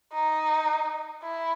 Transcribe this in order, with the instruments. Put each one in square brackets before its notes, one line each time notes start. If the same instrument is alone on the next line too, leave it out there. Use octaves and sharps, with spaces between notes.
[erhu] D#4
E4